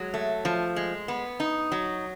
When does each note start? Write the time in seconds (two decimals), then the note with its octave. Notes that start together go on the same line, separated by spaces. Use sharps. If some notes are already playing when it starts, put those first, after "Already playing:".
Already playing: F#3 G#3
0.14 A3
0.45 F3
0.76 G#3
1.08 B3
1.40 D#4
1.72 F#3